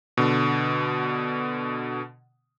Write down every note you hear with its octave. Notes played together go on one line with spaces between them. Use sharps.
B2 D3